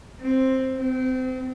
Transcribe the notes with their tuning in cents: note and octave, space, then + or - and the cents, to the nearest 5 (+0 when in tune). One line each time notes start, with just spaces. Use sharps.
C4 +5
C4 -30